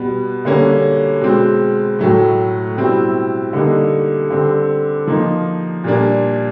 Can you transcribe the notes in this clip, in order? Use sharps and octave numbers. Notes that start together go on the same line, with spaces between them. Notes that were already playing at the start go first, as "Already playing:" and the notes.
Already playing: B2 G3 B3
D3 G3 A#3 C#4
B2 G#3 C4
A2 F#3 A3
B2 G3 C4 E4
D3 G3 A#3 D#4
D3 G3 C4
F3 A#3 D#4
A#2 G3 A#3 D4